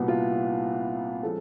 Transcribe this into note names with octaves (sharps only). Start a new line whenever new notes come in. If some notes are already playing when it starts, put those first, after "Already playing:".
Already playing: C2 A#2 G3 B3 F#4
F4
F3 G#3 C#4 A4